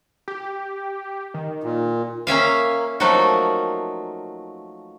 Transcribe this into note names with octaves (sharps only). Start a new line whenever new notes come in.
G4
D#3
A#2
A#3 C#4 E5 F5
F3 F#3 A3 A#3 D#4 F#4